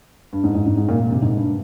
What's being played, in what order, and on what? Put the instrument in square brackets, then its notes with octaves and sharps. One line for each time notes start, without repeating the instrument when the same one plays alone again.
[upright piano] G2
G#2
G#2
G#2
G#2
A#2
A#2
C3
G#2
G2